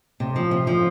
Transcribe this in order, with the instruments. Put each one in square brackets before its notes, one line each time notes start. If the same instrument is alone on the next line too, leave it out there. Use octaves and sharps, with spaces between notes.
[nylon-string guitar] C3
F3
C3
F3